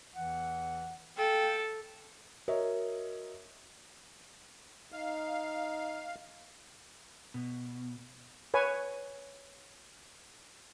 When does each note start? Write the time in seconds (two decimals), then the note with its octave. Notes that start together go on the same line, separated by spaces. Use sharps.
0.14 E2 E3 F#5
1.17 A4 F5 G5
2.48 F#4 A#4 C#5 D#5 E5
4.92 D#4 F5
7.34 B2
8.54 B4 C#5 G#5